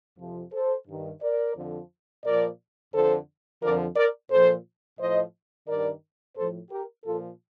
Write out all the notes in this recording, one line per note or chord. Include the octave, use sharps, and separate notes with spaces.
F2 C3 F3
A4 C5
G2 D#3
A#4 D5
F2 D3 F3
A#2 F3 A#4 D5
F2 D3 F3 A4 C5
F2 D3 F3 A#4 D5
A#4 D5
A#2 F3 A4 C5
A2 F3 C5 D#5
G2 D#3 A#4 D5
A2 F3 A4 C5
G4 A#4
A#2 F3 F4 A4